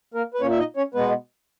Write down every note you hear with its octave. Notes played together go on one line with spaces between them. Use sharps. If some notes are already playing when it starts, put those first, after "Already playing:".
A#3 A#4
B4
A#2 A#3 C#4 C#5
E5
D#4 D#5
C#4 C#5
B2 G#3 B3 B4